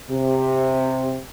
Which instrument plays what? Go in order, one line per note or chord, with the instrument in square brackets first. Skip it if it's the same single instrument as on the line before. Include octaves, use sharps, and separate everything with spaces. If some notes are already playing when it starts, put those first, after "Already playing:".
[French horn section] C3